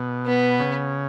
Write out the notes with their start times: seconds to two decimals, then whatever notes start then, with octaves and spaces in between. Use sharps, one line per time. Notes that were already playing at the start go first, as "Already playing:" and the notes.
Already playing: B2
0.26 B3
0.60 C#3